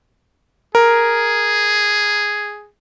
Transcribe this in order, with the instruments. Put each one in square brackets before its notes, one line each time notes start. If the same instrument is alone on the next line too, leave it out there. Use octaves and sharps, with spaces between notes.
[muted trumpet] G#4 [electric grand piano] A#4